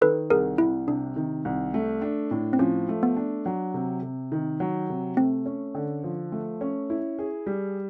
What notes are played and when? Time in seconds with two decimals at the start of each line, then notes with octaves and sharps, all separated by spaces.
0.01 D#3 A4 B4
0.30 C2 G#4 A#4
0.58 C2 E4
0.88 C3 D4
1.16 D#3
1.45 C2
1.74 A3
2.02 D4
2.31 A2
2.53 C4
2.59 F3 C#4
2.89 A3
3.03 B3
3.16 D4
3.46 F#3
3.74 C3
4.02 C3
4.32 D#3
4.60 F#3
4.89 C3
5.17 A3 C4
5.46 C#4
5.75 D3
6.04 F3
6.32 A3
6.61 C#4
6.90 E4
7.19 G#4
7.47 G3